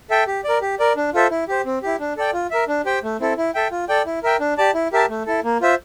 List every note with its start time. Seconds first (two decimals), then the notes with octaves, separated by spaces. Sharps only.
0.10 A4 E5 G5
0.27 G4
0.44 A#4 D5
0.61 G4
0.79 A#4 D5
0.96 D4
1.13 F4 A4 C5 E5
1.31 E4
1.48 G4 C5
1.65 C4
1.82 E4 G4
2.00 D4
2.17 A4 D5 G5
2.33 F4
2.51 A#4 E5
2.68 D4
2.85 G4 C5 G5
3.03 A3
3.20 C4 E4 A4
3.37 E4
3.55 A4 E5 G5
3.71 F4
3.89 A4 D5 G5
4.06 E4
4.23 A#4 E5 G5
4.40 D4
4.58 G4 D5 A5
4.74 E4
4.92 G4 A#4 E5 A5
5.09 A3
5.26 E4 A4
5.44 A#3
5.61 F4 C5 E5